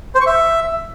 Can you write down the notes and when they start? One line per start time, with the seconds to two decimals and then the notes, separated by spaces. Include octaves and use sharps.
0.15 C5
0.21 C#6
0.26 E5